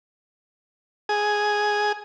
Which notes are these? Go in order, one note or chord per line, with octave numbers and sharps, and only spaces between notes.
G#4